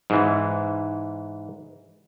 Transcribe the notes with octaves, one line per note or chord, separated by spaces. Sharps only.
G#2 E3